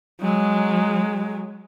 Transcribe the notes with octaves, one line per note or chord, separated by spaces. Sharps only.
F#3 G#3